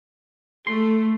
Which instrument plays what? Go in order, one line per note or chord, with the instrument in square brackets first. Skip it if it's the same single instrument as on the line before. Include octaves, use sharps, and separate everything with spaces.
[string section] A3 [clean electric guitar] C6